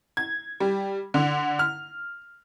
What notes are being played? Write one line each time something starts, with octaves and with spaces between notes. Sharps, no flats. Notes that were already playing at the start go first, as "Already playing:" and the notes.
G#6
G3
D3
F6